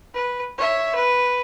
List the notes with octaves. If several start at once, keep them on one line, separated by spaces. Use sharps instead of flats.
B4
C#5 E5
B4